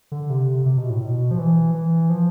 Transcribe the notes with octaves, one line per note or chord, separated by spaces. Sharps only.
D3
C3
C3
B2
A2
B2
F3
E3
E3
F3